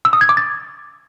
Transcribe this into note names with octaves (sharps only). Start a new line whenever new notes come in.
E6
D#6
G#6
D6
A6